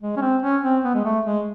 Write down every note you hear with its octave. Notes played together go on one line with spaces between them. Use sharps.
G#3
C#4
C4
C#4
C4
B3
G#3
A3
G#3